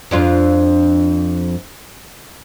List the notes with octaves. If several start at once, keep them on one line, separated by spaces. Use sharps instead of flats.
F2 D4 F4